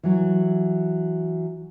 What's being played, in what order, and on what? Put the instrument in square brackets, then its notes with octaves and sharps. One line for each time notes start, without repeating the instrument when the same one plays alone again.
[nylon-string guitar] E3 F#3